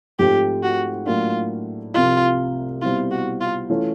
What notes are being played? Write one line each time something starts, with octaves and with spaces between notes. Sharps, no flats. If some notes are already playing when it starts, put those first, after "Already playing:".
G#2 F3 A3 C4 F4 G4
F#4
A2 F#3 A#3 D4 F4
C2 C3 F3 F4
B2 G3 C4 E4 F4
F#4
F4
E3 A3 C#4 F4